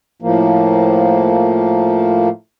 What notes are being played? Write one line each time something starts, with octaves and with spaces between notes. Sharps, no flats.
A2 F3 A#3